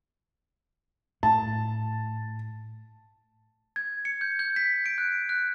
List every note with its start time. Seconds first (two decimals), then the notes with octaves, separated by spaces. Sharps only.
1.23 A2 A5
3.76 G#6
4.05 C#7
4.21 G6
4.39 G6
4.56 B6
4.86 D7
4.98 F#6
5.29 F#6